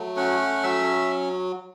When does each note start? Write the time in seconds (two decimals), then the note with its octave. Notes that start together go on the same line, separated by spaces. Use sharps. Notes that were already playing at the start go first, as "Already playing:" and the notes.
Already playing: F#3 A3
0.17 C#4 F#5
0.63 F#3 E5